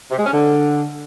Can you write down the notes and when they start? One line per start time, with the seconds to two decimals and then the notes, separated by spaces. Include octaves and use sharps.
0.11 C3
0.18 G#3
0.26 C#4
0.33 D3